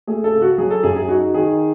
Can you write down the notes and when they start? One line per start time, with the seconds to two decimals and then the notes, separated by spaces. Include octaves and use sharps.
0.07 A3 G#4
0.24 A4
0.34 C#3
0.42 F#4
0.58 F#3 G#4
0.70 A4
0.83 F#2 G#4
0.96 G#4
1.09 D#4 F#4
1.34 D#3 G#4